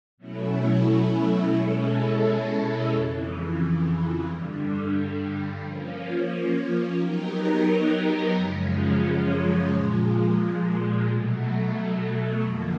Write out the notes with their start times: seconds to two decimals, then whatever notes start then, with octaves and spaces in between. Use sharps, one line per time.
0.17 B2 F#3 A3 C#4 E4
1.53 B2 G#3 C#4 E4 A4
2.90 F2 C#3 E3
4.25 G2 D3 G3
5.62 F3 A#3 C#4
6.97 F#3 B3 D#4 G4 A#4
8.34 F#2 C#3 F3 G#3 C#4
9.70 A#2 F3 G#3
11.06 B2 F#3 A3
12.42 F2 D3 F3 A#3